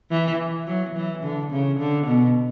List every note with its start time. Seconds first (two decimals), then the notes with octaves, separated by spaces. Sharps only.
0.11 E3
0.67 F#3
0.95 E3
1.23 D3
1.51 C#3
1.79 D3
2.07 B2